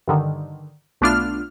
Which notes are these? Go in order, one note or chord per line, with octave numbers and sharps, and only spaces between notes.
G2 D3 D#3
B1 A3 B3 D4 F4 F6